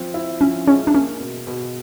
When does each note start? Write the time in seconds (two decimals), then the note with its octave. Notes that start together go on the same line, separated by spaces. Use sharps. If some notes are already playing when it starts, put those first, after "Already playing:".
Already playing: F3 C4
0.14 E4
0.41 F3 C#4
0.67 G#3 C#4
0.87 D4
0.94 A#3 C#4
1.20 B2
1.47 B2